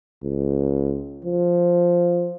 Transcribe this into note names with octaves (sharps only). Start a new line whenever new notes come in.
C#2
F3